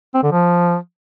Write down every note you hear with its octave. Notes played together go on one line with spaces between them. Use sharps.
C4
D3
F3